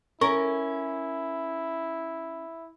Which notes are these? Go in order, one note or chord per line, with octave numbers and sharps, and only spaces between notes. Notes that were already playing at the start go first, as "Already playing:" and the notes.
C#4 E4 A#4 C#6